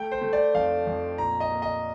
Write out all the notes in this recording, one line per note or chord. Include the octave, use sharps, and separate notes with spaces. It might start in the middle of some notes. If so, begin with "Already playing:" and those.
Already playing: A3 G5
C5
A3
D5
F2 F5
F2
A#2 A#5
D#5
A#3
D#5